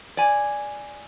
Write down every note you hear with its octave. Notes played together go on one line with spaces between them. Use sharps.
D5 G#5